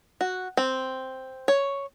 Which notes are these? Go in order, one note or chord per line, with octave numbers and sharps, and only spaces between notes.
F#4
C4
C#5